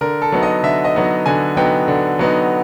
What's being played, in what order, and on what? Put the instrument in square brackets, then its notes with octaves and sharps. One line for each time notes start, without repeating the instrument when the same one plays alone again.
[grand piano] D3 A#4
A4
F#3 B3 D#4
D#5
D3 E5
D#5
F#3 B3 D#4
D3 G#5
F#3 B3 D#4 G5
D3
F#3 B3 D#4